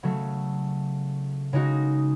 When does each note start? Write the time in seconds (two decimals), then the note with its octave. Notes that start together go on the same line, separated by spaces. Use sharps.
0.03 C#3 F#3 A3
1.53 C#3 G#3 D#4 F#4